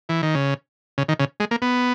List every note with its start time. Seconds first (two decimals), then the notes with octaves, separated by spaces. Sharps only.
0.09 E3
0.23 D#3
0.35 C#3
0.98 C#3
1.09 D#3
1.20 C#3
1.40 G#3
1.51 A#3
1.62 B3